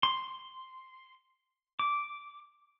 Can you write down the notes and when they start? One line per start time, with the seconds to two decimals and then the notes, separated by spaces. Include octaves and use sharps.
0.03 C6
1.79 D6